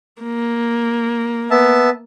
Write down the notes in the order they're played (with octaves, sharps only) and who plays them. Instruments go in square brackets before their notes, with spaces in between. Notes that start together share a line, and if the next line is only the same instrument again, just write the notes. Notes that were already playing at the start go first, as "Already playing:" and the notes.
[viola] A#3
[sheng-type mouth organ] B3 E5 A5